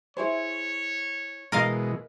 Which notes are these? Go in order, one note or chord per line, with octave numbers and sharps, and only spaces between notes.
E4 G#4 C5 C#5
B2 E3 G#3 A#4 D#5 F5